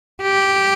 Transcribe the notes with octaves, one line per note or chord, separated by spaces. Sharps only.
G4